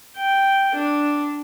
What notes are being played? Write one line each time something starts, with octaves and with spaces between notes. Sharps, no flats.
G5
D4